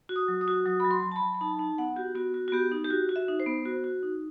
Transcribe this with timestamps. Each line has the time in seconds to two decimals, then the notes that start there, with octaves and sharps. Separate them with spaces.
0.09 F#4
0.16 D#6
0.28 F#3
0.41 D#6
0.48 F#4
0.66 F#3 D#6
0.80 F#3 B5
0.91 C6
1.03 F#3
1.11 A5
1.16 B5
1.21 F#3
1.35 B5
1.41 D#4 A5
1.59 D#4 A5
1.78 B3 F#5
1.96 F#4 G4
2.15 B3 F#4
2.34 F#4
2.48 F#4
2.52 B3 G4
2.72 D#4
2.84 G4
2.90 F#4
3.09 F#4
3.16 E5
3.28 D#4
3.40 C5
3.46 B3
3.66 F#4
3.84 F#4
4.03 D#4